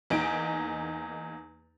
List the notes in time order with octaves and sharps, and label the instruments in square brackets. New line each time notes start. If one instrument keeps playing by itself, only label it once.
[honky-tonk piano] E2 A#3 D#4 G#5 D7